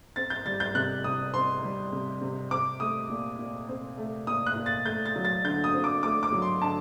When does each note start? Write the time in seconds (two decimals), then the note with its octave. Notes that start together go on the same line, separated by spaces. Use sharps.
0.16 C4 A6
0.30 G6
0.46 G3 A6
0.60 G6
0.75 C3 F#6
1.04 C3 D#6
1.34 C4 C6
1.63 G3
1.92 C3
2.21 C3
2.51 C4 D6
2.80 A3 D#6
3.10 A#2
3.39 A#2
3.69 C4
3.97 A3
4.27 A#2 D#6
4.47 F#6
4.56 A#2
4.66 A6
4.85 A3 G6
5.06 A6
5.16 F#3
5.25 A6
5.44 D3 G6
5.64 D#6
5.74 C4
5.84 D6
6.03 A3 D6
6.23 D6
6.32 F#3
6.42 C6
6.62 D3 A5